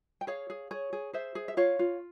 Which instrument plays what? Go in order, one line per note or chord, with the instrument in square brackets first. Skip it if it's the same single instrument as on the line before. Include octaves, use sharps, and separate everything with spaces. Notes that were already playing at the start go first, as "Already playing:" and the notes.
[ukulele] G5
G#4 C#5 F5
G#4
G#4 C#5
G#4
G#4 C5 E5
G#4
E5
F4 C#5 F5
F4